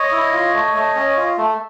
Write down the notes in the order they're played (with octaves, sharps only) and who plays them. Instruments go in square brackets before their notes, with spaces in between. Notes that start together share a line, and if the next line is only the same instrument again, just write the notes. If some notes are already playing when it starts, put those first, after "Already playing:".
Already playing: [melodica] C#5 D#5
E4
F4
A3
A3
C#4
F4
A3